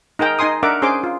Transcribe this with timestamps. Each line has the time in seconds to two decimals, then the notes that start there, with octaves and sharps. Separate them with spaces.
0.19 D#4 G#4 A#4 G5 A#5
0.39 D#4 D#5 G#5 C6 D#6
0.63 D4 A#4 E5 F#5 D6
0.82 C#4 G#4 C5 C6 D6
1.04 F4